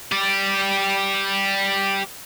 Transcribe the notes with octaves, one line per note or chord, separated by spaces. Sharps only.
G4 D5